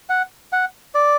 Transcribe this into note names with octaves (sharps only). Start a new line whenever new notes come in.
F#5
F#5
D5